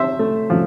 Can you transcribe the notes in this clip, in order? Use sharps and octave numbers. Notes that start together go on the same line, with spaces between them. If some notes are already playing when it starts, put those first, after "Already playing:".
Already playing: C3 C5 E5
A3
F3